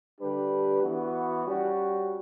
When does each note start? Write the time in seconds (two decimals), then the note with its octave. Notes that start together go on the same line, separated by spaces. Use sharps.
0.20 D3 G3 D4 G4 B4
0.83 E3 B3 F#4
1.46 G3 C#4 F#4